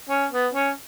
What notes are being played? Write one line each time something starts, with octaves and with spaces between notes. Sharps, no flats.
C#4
B3
C#4